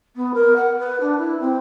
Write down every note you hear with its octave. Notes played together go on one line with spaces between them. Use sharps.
B3
A#4
F#5
B4
D4
E4
C4